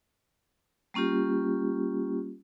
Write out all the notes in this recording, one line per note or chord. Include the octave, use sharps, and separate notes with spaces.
G3 A#3 C#4 F4 G4